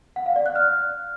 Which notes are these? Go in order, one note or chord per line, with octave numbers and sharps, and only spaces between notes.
F#5
F5
D5
F#6
F6